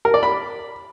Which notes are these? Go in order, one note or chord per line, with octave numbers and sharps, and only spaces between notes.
A#4
D5
B5